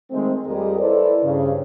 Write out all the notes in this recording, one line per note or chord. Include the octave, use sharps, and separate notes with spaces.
D#3 G#3 A3 C4
F2 G3 G4 G#4 A#4 D#5
E4 A4 B4 C5 D5
G2 C#3